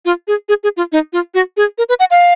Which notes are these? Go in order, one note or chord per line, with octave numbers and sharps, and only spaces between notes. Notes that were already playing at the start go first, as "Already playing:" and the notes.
F4
G#4
G#4
G#4
F4
D#4
F4
F#4
G#4
A#4
B4
F#5
F5